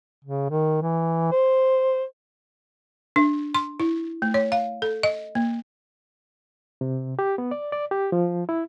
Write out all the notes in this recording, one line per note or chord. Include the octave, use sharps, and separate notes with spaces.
C#3
D#3
E3
C5
D4
C6
E4
A3
C#5
F5
A4
D#5
A#3
C3
G4
B3
D5
D5
G4
F3
E4